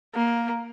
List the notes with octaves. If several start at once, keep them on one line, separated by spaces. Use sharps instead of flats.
A#3